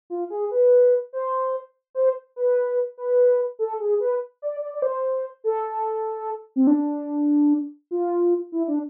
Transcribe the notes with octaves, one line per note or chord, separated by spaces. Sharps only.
F4
G#4
B4
C5
C5
B4
B4
A4
G#4
B4
D5
D5
D5
C5
A4
C4
D4
F4
E4
D4